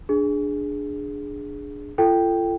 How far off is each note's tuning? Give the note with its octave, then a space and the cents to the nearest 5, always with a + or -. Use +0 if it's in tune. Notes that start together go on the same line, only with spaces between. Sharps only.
D4 +0 G#4 +0
F4 -35 A4 +10 G5 +0